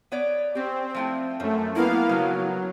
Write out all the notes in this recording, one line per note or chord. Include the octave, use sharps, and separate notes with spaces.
B3 C#5 D5
C4 C#4 G4
F3 A3 E4
F#2 F3 A3
A#3 B3 E4 F5
C#3 F3 F#3